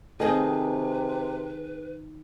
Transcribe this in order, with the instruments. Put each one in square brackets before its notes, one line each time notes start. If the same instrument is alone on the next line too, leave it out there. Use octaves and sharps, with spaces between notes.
[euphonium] C3 [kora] D#3 D#5 [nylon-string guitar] C4 G#4 A4 [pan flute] B4